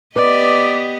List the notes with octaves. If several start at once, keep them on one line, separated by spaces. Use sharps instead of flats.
B3 G4 B4 D5 D#5 D6